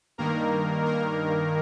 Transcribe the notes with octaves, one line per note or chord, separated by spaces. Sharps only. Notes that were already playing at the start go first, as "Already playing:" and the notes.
G2 D#3 A#3 A#4
A#3 A#4